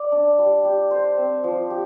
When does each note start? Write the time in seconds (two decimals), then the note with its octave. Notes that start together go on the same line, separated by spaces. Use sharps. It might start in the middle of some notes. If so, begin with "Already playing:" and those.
Already playing: D5
0.12 D4
0.39 G3
0.65 G4
0.91 C5
1.17 C4
1.44 F3
1.70 G4